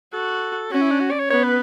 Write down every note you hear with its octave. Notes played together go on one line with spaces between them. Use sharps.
F#4 A4
C#4 F#4
E4
D4
F#4
D5
C#5
B3 C#5
B4